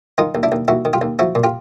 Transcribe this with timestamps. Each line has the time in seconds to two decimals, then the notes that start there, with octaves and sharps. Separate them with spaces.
0.18 D#3 D#4 F4
0.35 D#2
0.43 D4 E4
0.52 D#2
0.68 D#2 E4 F#4
0.85 D#3
0.93 F4 G4
1.01 D#2
1.19 F3 E4 F#4
1.35 A#2
1.44 F4 G4